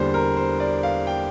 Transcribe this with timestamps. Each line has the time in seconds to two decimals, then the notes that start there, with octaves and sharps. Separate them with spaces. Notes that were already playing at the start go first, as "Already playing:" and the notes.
Already playing: E2 D3 G3 A#3 D4 C5
0.14 A#4
0.37 C5
0.60 D5
0.83 F5
1.07 G5